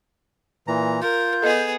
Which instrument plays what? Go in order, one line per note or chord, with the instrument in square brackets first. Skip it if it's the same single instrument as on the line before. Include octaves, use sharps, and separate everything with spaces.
[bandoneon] A#2 E3 A#5
[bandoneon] F4 [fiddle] A#4 [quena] G6
[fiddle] B3 G#4 [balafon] A4 D#5